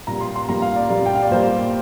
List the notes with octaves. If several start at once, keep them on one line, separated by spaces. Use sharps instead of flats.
A#2 G3 A#3 A#5
C6
C6
A#2 G3 A#3 A#5
F5
D5
A#2 G3 A#3
G5
F5
D5
A#2 G3 A#3 C5